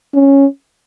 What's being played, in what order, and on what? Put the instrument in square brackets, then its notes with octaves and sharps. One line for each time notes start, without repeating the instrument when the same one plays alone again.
[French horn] C#4